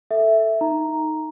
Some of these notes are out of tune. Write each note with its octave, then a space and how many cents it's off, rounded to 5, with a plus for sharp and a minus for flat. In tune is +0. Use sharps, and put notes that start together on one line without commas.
A4 +0 E5 +0
D#4 +0 A#5 +0